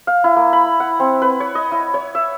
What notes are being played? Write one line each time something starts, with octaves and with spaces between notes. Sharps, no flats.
F5
E4
A#3
B5
F#5
C4
B4
C#5
D#5
E4
C#5
E5